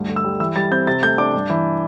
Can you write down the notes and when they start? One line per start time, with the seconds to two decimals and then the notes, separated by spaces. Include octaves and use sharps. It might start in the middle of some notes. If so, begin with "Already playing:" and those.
Already playing: D2 G2
0.08 D3
0.16 E6
0.24 G3
0.40 E3 E6
0.56 G3 A6
0.71 C4 G6
0.87 C3 A6
1.02 A3 G6
1.18 D4 D6
1.34 G2
1.50 E3